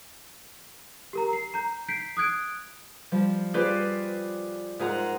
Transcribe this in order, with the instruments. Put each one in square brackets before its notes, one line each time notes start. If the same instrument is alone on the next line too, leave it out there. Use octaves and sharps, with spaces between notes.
[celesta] G4 A#4 A#5
C7
A#5 G6
G6 B6 C7 D7
D#6 F#6 G#6 D7
[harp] F3 G3
F4 G4 G#4 B4 C5 D5
G#2 F4 G#4 A#4 F#5 A#5